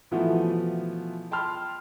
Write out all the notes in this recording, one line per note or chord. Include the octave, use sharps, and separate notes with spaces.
B2 E3 F3 A3 B3
G5 A5 B5 C6 F6